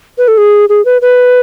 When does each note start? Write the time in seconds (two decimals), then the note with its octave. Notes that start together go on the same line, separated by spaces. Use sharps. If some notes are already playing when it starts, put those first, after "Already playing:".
0.18 B4
0.28 A4
0.38 G#4
0.69 G#4
0.85 B4
1.02 B4